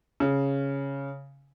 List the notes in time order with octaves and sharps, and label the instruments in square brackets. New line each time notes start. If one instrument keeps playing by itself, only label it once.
[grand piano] C#3